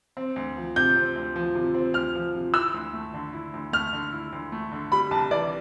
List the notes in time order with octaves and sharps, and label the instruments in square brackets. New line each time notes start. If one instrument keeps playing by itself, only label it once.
[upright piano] C4
D2
F3
[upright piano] C3 [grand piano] G6
[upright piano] C4
D2
F3
C3
C4
[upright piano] D2 [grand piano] F6
[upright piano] F3
C3
[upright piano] E4 [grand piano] E6
[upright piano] D2
A3
D3
E4
D2
[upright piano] A3 [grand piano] F6
[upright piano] D3
E4
D2
A3
D3
[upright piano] G3 [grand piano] B5
[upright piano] C2 [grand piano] A5
[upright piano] E3 [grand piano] D5